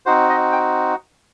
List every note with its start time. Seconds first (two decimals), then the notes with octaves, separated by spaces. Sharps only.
0.06 C4 D#4 F#4 C5
0.29 D#5
0.52 G5